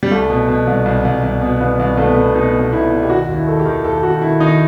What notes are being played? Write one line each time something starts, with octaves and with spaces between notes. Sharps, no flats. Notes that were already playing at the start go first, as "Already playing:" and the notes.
G3
C2 A3
B2
B2
C2
C2
C2
C2
B2
C2 B3
C2
C2 A3
B3
B2 A3
B2 D#4
B2
B2 E4
B2
G4
D#3 F#4
D#2
E4
D#3 A4
G4
D#3
D#2 A4
D#2 F#4
D#3 E4
D#3 D#4